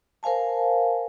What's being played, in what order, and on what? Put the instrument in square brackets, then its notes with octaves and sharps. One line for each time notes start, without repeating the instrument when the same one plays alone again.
[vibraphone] A#4 C5 F5 G#5 A5